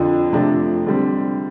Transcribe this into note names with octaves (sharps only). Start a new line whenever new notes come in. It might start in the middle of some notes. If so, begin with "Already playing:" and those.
Already playing: F2 D3 F3
C3 F3 A3 D4
D3 G3 C4